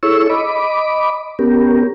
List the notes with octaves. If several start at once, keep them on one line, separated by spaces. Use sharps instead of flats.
E4 G#4 A4 C#5 C#6 E6
D#5 B5 D6
B3 C#4 G4 A#4